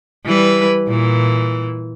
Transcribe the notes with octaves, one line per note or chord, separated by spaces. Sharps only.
E3 G3 B4
A#2 E3